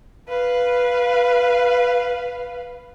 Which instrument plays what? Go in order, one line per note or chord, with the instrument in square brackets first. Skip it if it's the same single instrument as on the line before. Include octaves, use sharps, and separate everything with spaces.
[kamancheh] B4 F5